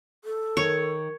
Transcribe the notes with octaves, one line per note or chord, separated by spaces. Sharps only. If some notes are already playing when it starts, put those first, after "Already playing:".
A4
D#3 D#4 C#5